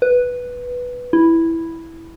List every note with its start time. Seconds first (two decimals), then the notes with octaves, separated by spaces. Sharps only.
0.02 B4
1.13 E4